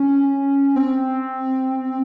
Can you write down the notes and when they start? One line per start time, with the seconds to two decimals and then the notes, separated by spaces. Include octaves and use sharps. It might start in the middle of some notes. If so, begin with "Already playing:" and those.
Already playing: C#4
0.76 C4